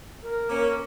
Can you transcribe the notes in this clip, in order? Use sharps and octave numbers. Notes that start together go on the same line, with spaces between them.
A#4
A#3 C#4